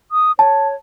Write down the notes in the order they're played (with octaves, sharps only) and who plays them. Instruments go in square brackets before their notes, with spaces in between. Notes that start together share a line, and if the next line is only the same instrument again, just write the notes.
[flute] D#6
[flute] C#5 [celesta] A5